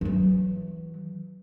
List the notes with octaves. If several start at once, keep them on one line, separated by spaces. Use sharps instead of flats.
E3 F#3